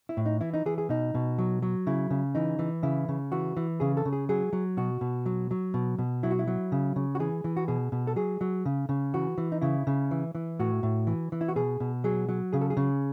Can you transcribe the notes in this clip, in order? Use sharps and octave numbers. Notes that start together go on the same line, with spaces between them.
E4
A2
D#4
E3 E4
D#4
E3 G#4
G#4
B2 D#4
B2
F#3
F#3
C#3 E4
C#3
E3 D#4
E3
C#3 E4
C#3
E3 F#4
E3
C#3 G#4
A4
C#3
G#4
F#3 G#4
F#3
B2 F#4
B2
F#3
F#3
B2
B2
F#3 E4
F#4
E4
F#3
C#3
C#3
F#4
E3 G#4
E3
F#4
B2 G#4
B2
A4
F#3 G#4
F#3
C#3
C#3
E3 F#4
E3
D#4
C#3 E4
C#3
E3
E3
A2 F#4
A2
E3
E3
E4
F#4
B2 G#4
B2
F#3 G#4
F#3
C#3 G#4
A4
G#4
C#3